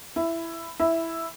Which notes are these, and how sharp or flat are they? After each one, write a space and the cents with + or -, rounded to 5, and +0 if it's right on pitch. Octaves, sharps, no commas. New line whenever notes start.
E4 +10
E4 +0